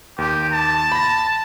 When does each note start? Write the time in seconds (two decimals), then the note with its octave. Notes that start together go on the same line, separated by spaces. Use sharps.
0.18 D#2 G4
0.53 A5
0.92 B5 A#6